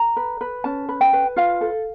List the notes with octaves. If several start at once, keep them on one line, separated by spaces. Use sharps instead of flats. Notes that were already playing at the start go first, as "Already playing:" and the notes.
Already playing: A#5
B4
B4
C#4 A5
B4
G5
B4
F4 F5
A4